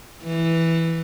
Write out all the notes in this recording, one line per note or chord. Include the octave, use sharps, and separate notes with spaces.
E3